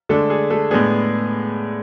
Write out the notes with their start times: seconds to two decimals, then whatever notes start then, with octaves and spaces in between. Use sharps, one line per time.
0.09 D3 G#3 A3 D4 A4
0.30 G#4
0.50 A3 A4
0.70 A2 G#3 B3 D4 G#4